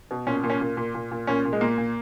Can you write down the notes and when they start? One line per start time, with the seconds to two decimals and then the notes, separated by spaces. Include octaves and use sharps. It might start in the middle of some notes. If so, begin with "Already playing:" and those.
0.11 B2
0.27 A#2 C#4
0.44 A#2
0.50 C#4
0.61 A#2
0.77 A#2
0.94 A#2
1.11 A#2
1.27 A#2 C#4
1.45 A#2
1.53 G#3
1.61 A#2 A#3
1.78 A#2